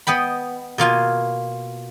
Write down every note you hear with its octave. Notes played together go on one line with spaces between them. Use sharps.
B3 D#5 G5 B5
B2 A#3 F4 G#5